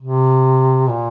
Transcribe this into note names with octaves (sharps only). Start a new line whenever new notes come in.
C3
A#2